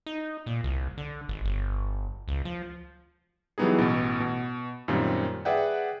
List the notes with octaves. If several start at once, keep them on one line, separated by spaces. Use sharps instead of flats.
D#4
A#2
C2
D3
G#1
G1
C#2
F3
E3 F#3 G3 B3 D#4 G#4
A1 B2
B2
F#2 A#2 D#3 G3 C4
G#4 B4 D5 E5 F#5 G5